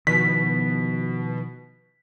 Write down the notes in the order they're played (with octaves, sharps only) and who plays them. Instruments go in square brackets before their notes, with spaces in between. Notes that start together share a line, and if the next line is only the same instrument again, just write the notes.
[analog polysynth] B2 [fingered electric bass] D#3 F3 [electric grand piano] B6